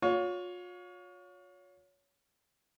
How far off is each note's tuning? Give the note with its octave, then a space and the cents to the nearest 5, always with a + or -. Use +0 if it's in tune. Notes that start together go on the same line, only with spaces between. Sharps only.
F4 +40 C#5 +20